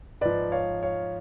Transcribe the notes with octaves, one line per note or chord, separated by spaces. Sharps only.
G#2 F3 B4 D5
C#5 F5
C#5 F5